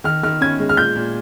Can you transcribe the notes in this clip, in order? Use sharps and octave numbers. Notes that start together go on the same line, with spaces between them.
D#3 F6
D#3 F6
C#4 G#6
G#3
F6
A#2 G6
A#2